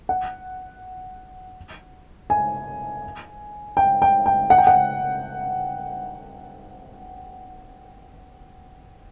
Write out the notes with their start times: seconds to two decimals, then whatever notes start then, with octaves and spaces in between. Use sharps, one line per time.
0.09 F#5
2.30 G#5
3.77 G5
4.02 G5
4.26 G5
4.50 F#5
4.58 G5
4.67 F#5